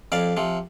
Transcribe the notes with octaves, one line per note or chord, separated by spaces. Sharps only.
F2 D5 F5
C3 F3